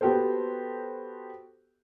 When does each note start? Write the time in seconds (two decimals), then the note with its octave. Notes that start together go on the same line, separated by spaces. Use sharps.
0.01 B3 F#4 G4 A4 C5